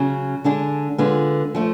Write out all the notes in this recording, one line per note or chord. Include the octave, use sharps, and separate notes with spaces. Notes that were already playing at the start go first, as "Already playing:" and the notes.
Already playing: C#3 F#3 C#4
D3 G#3 D4 G#4
D3 G#3 B3 F4
F3 A3